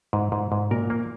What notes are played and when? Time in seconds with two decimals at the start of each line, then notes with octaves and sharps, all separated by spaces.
0.13 G#2
0.32 G#2
0.52 G#2
0.71 A#2 A#4
0.90 A#3